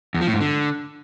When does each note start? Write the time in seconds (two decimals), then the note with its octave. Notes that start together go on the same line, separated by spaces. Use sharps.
0.14 E2
0.21 F3
0.28 A2
0.34 G#2
0.41 D3